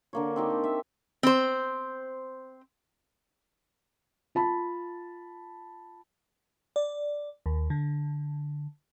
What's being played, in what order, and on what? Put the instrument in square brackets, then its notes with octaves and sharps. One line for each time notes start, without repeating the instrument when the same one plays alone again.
[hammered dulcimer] D3 A#3 C#5
C4 D#4 G4
A4
E5
[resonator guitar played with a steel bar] C4 C5
[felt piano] F4 A5 B5
[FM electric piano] D5
D#2
D3